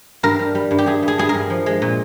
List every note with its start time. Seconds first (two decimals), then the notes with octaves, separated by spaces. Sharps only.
0.23 G2 A#4
0.39 G3
0.55 G3
0.71 G2
0.78 G4
0.86 G2 G#4
1.03 G2
1.08 G#4
1.18 G2 G#4
1.29 A#4
1.34 G2
1.50 F3
1.66 G#3
1.82 A#2